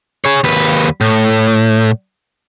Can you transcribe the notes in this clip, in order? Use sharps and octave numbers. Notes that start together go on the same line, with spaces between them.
G#4 C#5
D#2 B4
A2